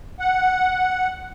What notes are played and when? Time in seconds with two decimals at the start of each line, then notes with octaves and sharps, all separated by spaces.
0.20 F#5